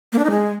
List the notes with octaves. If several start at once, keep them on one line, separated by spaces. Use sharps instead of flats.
A#3
D4
D#4
G#3